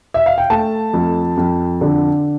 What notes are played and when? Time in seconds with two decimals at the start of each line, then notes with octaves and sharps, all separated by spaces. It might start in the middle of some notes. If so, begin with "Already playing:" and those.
0.14 E5
0.26 F5
0.38 G5
0.50 A3 A5
0.94 F2
1.37 F2
1.81 D3